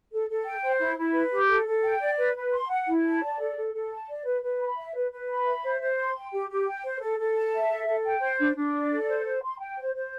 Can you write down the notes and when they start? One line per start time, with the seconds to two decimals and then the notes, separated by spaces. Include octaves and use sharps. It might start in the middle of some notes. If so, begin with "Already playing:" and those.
0.12 A4
0.29 A4
0.45 G5
0.63 C5
0.80 E4
0.97 E4
1.14 B4
1.32 G4
1.49 A4
1.66 A4
1.84 G5
2.00 D5
2.18 B4
2.35 B4
2.52 C6
2.70 F#5
2.86 E4
3.04 A5
3.22 D5
3.39 A4
3.56 A4
3.74 A4
3.91 A5
4.08 D5
4.25 B4
4.43 B4
4.60 B5
4.76 E5
4.94 B4
5.11 B4
5.29 B5
5.45 E5
5.62 C5
5.80 C5
5.97 C6
6.14 G5
6.32 G4
6.49 G4
6.66 G5
6.83 C5
7.01 A4
7.18 A4
7.35 A5
7.52 E5
7.69 A4
7.86 A4
8.05 G5
8.21 C5
8.38 D4
8.56 D4
8.74 D5
8.91 A4
9.08 C5
9.25 C5
9.42 C6
9.59 G5
9.76 C5
9.94 C5